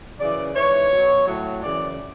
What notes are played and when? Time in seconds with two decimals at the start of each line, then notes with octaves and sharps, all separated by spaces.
0.19 F#2 C#3 E3 D5
0.55 G#2 E3 C#5
0.91 B2 F#3
1.27 A2 F#3
1.62 F#2 C#3 E3 D5